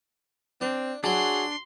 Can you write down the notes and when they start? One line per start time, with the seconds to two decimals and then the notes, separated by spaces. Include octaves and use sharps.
0.61 C4 D4
1.04 F#3 D4 F#4 G#4 C6